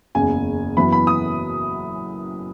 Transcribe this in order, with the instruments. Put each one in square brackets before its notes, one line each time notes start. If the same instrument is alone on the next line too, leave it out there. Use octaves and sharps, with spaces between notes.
[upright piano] F#1 E2 C#3 G#5
F#2 E3 B3 E4 B5
B5
D#6